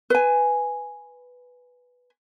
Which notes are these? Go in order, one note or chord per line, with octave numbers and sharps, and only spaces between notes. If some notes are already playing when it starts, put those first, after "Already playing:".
B4 G#5